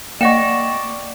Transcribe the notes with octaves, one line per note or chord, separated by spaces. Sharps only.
A#3 D5 D#5 F#5 G5 C#6 A#6 E7